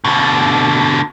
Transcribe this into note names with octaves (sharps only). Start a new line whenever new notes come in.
B2 D3